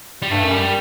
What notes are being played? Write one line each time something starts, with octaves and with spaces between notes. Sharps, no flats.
G3
G2 A3
F#2
G3